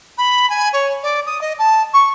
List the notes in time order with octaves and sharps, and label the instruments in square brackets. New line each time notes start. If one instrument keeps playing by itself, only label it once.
[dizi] B5
G#5
C#5
D5
D#6
D#5
A5
C#6